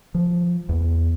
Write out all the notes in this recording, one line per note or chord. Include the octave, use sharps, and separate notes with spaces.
F3
E2